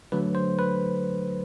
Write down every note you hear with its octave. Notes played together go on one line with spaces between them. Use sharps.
D3 F#3 A3 B4
C5
B4